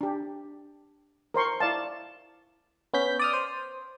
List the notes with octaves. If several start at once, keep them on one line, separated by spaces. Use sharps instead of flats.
D4 G4
A#4 C5 C6 C#6
E4 D5 F5 A5
B3 C#4 G6 B6
D5 D#6 F6
C5